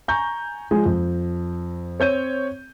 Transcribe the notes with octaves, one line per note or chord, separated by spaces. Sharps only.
G#5 A#5 C#6 G6
F3 G#3 G#4
F2
C4 C#5 G6 D#7